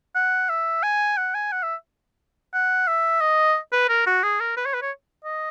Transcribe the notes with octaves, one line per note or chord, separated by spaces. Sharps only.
F#5
E5
G#5
F#5
G#5
F#5
E5
F#5
E5
D#5
B4
A#4
F#4
G#4
A#4
B4
C#5
B4
C#5
D#5